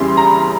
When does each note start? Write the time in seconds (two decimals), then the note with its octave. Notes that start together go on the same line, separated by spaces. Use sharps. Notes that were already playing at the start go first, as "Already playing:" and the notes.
Already playing: E2 C#3 E3 G3 C6
0.17 A#5
0.27 B5